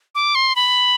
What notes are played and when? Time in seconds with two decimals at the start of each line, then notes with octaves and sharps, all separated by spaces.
0.15 D6
0.35 C6
0.56 B5